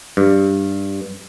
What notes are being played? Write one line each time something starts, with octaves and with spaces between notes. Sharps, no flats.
G2